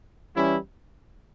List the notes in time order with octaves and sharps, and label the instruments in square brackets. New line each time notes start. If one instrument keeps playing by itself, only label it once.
[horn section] E3 G3 C#4 E4